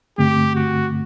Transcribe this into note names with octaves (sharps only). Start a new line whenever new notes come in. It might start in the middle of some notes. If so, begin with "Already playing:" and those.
G2 D3 A3 C4 G4
F#4